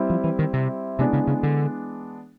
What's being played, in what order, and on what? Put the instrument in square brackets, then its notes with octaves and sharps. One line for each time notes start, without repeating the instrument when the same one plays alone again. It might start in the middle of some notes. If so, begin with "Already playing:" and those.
Already playing: [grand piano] G3 C4 E4
[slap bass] F3
E3
D#3
C3
[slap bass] C3 [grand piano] E3 G#3 B3 D4
[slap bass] C#3
C#3
D3